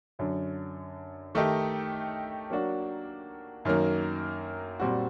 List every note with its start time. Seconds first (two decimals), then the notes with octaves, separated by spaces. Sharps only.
0.19 F#2 D3 F#3
1.35 D#3 A3 D#4 G4
2.50 F#3 A#3 D4 F#4
3.65 F#2 D#3 F#3 A#3
4.80 A#2 G3 C4 F#4